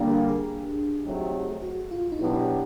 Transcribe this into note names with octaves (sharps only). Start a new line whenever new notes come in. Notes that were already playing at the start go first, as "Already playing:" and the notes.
Already playing: D3 G3 A#3 D4
G4
G#4
F#3 A3 C4 D#4 G4
F#4
F4
D#4
B2 F#3 B3 D4 E4 G4